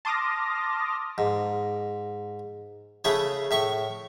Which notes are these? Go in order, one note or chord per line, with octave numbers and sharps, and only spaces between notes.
A5 C6 D6 D#6 F6 A#6
G#2
C#3 A3 E4 G#4 C#5
A2 E5 C#6